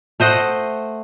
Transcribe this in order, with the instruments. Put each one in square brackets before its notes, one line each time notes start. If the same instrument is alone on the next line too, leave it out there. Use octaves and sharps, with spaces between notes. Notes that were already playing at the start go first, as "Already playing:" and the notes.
[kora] A3 C5 D#5 F#5